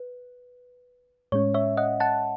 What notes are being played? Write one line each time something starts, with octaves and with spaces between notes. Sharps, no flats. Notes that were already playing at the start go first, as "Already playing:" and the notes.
Already playing: B4
A2 G#3 C#4 C#5
C#5 E5
D#5 F#5
F#5 A5